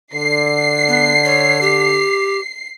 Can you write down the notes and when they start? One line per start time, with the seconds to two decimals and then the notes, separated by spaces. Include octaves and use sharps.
0.14 D3 C7
0.88 B3
1.25 C#5
1.61 G4